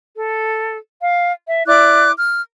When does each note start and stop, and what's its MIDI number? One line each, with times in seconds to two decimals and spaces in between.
0.16 0.77 69
1.02 1.32 77
1.47 1.62 76
1.67 2.11 64
1.67 2.11 74
1.67 2.11 86
1.67 2.11 90
2.18 2.41 89